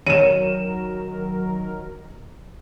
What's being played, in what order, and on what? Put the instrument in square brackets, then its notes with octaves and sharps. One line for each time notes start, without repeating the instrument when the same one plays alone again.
[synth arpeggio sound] D#3 F#3 A#4 [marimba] C#5 [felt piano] D#7 E7